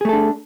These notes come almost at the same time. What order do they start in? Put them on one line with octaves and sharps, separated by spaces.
G#4 A3 A4 D4